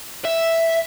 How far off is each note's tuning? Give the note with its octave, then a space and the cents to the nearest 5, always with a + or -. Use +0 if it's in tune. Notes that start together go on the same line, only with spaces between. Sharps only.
E5 +0